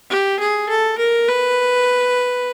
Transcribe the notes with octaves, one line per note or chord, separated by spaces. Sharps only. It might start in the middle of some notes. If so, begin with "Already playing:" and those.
G4
G#4
A4
A#4
B4